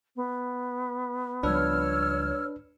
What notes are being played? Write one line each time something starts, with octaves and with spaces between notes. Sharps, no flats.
B3
C#2 F3 G3 D4 B4 C#5 E6 F6